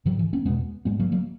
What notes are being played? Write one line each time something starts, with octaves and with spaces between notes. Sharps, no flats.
G#2 D#3 F#3
E3
A#3 C#4
E2 B2 G#3 B3
G#2 G#3 B3
F#3 A#3
F#3 A#3